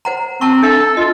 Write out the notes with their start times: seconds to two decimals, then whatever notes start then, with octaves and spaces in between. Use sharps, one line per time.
0.05 C5 F#5 A#5
0.41 C4 A5 A#5 C#6
0.63 D4 A4 E5
0.97 F4 D#5